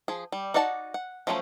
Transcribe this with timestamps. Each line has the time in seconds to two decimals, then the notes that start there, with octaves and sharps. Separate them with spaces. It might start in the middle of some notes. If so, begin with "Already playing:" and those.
0.08 F3 G#4
0.32 G3
0.54 D#4 F#4 D5 F#5 A5
0.94 F#5
1.27 F3 F#3 A3 C#4 C5